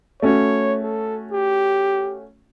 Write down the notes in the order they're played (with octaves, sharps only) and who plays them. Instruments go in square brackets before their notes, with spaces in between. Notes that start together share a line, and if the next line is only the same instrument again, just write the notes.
[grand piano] A3 C#4 F#4 [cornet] C#5
[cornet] A4
G4